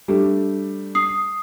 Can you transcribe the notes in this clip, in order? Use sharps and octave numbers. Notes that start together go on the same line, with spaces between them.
G3 A3 D4
D#6 C7